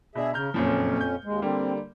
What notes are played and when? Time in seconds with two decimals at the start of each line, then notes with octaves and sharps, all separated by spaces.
0.15 B2 D4 G#4 E5
0.33 C#3 A#5 F6 G6
0.54 F#1 F2 A#2 F3 C#4
1.01 G6
1.24 D#2 G#3
1.42 D3 G3 A#3 C4